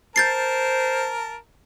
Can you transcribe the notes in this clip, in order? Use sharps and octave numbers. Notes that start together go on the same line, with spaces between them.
A#4 C5 A5 G6 A6 C7